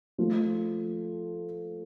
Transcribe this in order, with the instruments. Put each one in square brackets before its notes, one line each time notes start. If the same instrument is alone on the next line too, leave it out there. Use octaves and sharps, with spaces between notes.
[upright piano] F3 A3 F4